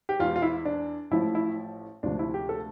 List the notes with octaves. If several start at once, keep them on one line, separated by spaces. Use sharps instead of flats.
G4
E2 E3 F4
F4
E4
D4
A1 A2 F3 E4
E4
D2 C3 F3 D4
E4
G4
A4